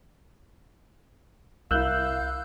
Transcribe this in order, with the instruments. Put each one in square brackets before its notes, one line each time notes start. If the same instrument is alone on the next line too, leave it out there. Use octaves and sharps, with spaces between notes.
[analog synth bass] C2 [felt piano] E4 A#4 [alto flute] F5 [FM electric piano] E6 F#6 G6